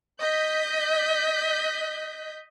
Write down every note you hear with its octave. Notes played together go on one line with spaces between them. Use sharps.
D#5 G6 B6